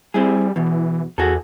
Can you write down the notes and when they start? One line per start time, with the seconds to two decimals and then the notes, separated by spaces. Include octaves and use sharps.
0.14 G3 C4 E4 G#4
0.56 E2 B2 E3
1.18 E2 F#4 G#4 A4